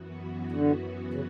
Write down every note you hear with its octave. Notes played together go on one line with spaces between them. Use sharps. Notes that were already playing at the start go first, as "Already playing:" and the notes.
Already playing: F#2 E3 B3 F#4
D3
C#3